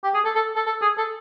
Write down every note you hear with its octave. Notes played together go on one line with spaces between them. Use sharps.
G4
G#4
A4
A4
A4
A4
G#4
A4